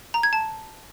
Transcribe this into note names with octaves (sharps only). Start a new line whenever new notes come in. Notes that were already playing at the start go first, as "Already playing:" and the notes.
A#5
G#6
A5